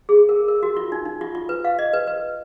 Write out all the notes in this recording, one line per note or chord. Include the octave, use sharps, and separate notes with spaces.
G#4
A#4
A#4
F#4
F4
D#4
D#4
F4
F4
B4
F5
D#5
B4
B4